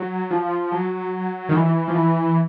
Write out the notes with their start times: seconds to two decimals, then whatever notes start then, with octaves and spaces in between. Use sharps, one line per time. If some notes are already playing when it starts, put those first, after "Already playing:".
Already playing: F#3
0.31 F3
0.72 F#3
1.49 D#3
1.54 E3
1.88 F3
1.95 E3